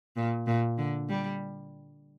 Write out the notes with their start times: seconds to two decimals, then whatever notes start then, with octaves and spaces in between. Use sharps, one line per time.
0.17 A#2
0.47 A#2
0.78 D3
1.09 G3